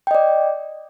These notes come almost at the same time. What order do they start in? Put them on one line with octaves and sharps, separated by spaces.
G5 D#5 D5